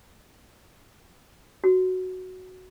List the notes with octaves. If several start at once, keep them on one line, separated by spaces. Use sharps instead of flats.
F#4